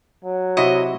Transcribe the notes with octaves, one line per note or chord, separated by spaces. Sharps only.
F#3
C3 E4 F#4 D#5